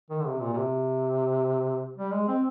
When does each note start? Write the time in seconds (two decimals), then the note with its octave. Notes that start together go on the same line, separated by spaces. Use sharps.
0.10 D#3
0.20 D3
0.26 C3
0.41 A#2
0.53 A#2
0.57 C3
1.97 G3
2.12 G#3
2.28 C4